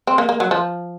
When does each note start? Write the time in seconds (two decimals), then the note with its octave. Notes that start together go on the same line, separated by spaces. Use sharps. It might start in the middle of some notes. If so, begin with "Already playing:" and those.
0.07 C4
0.18 A#3
0.29 A#3
0.40 F#3
0.51 F3